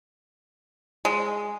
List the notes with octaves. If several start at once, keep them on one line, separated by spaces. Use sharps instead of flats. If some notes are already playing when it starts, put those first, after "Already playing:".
G#3